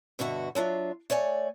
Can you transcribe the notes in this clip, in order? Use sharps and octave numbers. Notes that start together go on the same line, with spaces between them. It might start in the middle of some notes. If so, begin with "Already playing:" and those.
G2 B2 D3 F#4 E5
F#3 D4 F4 E5
A3 C#5 D5 G#5